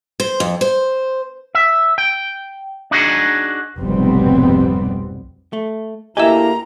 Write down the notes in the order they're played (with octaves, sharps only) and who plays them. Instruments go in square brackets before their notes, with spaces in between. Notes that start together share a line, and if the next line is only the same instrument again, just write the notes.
[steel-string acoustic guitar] C5
F2
C5
[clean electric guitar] E5
G5
D4 D#4 F#4 G#4
[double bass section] F1 B1 G#2 G3 B3 C4
[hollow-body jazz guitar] A3
[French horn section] D2 A#3 E4 [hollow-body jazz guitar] G4 D#5 [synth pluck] E5 G#5 [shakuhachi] A#5